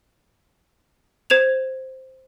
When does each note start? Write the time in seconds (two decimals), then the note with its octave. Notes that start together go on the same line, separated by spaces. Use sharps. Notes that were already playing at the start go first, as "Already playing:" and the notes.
1.30 C5 G#6 E7 F7